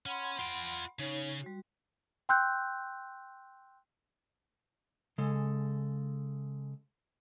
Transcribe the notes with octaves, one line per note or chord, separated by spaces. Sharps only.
C#4 F#5 B5 C6
F4 G5
C#3 D#4 C#5
G3 F#4
G5 C6 E6 F#6 G6
C#3 G#3 A4